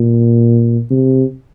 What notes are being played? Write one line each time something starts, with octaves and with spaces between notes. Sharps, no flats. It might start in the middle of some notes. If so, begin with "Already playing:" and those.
Already playing: A#2
C3